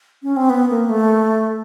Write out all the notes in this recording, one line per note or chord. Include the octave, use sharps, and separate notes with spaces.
C#4
C4
B3
A#3
A3